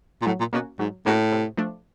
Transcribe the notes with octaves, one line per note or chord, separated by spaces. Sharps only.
A#2
A2 F#3
A#2
B2 A#3 C#4 F#4
G#2 F#3
A2 A#3 C#4 F#4
C3
F3 A3 D4